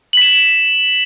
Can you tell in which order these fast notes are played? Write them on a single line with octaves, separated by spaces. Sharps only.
F#7 B6 E7